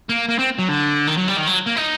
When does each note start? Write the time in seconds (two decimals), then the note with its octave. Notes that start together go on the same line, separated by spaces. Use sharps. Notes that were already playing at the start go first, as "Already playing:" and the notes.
0.09 A#3
0.29 A#3
0.39 C4
0.59 F#3
0.68 D3
1.07 D#3
1.17 F#3
1.28 G3
1.37 D#3
1.47 F#3
1.67 A#3
1.77 D#4